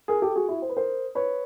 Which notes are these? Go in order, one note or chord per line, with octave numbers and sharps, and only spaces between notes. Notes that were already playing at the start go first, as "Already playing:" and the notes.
G#4 A#4
G4 A4
F#4 G#4
E4 F#4
C5
B4
A#4 C5
B4 C#5